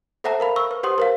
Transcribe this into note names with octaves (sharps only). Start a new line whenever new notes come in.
A4 C5 E5 F#5 A5 A#5
A#4 F5 B5
C#6 E6
B4
G4 C5 F#5 C6 D#6
A#4 C5 F5